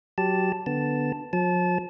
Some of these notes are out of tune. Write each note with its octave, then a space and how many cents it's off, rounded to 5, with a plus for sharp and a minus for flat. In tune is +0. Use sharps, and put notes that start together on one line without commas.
F#3 +0 G4 -5 A5 +0
D3 +0 B3 +0 A5 +0
F3 +45 A5 -25